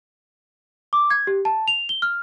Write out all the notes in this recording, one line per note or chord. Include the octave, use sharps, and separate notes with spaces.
D6
G#6
G4
A5
F7
G7
F6